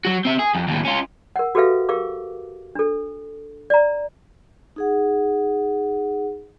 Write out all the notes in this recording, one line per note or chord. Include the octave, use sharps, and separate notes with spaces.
F#3 F#4
C4 E5
G#4
F2
D#2 A2
C#4 F4
A#4 F#5
F#4 G4 A4 B4 E5 F5
G4 A#4 F5 D6
D4 A4
D5 A#5
D#4 G#4 F#5